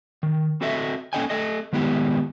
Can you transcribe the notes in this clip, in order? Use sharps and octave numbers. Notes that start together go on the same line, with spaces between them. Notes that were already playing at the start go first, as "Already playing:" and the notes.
D#3
C4 F#4 A4 D#5 E5
A#3 C#4 A4 D#5 G5 G#5
A3 A4 D#5
D#3 G#3 B3 E4 G4